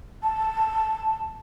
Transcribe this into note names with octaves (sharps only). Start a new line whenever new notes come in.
A5